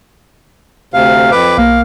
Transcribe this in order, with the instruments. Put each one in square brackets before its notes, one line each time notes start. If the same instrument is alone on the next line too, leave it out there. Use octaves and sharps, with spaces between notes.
[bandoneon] D2 C3 F5
F2 B4 D6
[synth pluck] B1 A#3 [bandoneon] F5